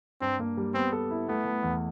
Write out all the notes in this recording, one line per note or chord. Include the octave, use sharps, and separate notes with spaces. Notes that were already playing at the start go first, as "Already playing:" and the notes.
G2 C4
A#3
G3
B3 C4
A4
E4
A3 B3
A3
E2